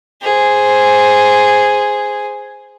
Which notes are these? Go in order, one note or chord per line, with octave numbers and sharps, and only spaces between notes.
G#4 C5